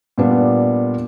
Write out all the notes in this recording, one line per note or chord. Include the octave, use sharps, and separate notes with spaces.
A#2 G3 B3 D4